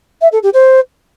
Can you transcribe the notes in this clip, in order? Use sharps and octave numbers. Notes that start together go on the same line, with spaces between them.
E5
A4
G4
C5